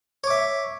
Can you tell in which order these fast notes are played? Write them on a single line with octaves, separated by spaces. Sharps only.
C#5 D6 E5